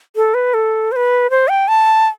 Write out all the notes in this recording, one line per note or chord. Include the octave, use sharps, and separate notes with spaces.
A4
B4
A4
C5
B4
C5
G5
A5